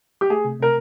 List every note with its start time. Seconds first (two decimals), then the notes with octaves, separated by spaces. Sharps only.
0.21 G4
0.30 A3 G#4
0.45 C3
0.60 C3 A#4